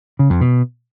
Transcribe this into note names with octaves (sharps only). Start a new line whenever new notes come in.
C#3
F2
B2